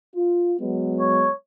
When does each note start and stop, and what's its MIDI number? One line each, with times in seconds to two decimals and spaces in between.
0.15 0.54 65
0.60 1.29 54
0.60 1.29 56
0.60 1.29 59
1.00 1.33 73